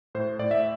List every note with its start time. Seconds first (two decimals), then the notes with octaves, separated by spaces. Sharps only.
0.15 A2 C5
0.39 A2 D5
0.51 E5